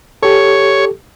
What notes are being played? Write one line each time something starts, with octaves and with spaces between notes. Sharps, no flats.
G4 A4 C#5